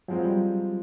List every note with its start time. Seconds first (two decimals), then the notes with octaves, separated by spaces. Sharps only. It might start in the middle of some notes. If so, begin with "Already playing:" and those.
0.08 F3 F#3 G#3 C4 F4
0.25 G3